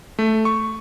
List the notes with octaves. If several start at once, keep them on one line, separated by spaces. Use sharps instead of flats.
A3
C#6